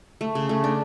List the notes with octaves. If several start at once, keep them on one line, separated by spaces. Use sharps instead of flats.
A3
C#3
A3
D4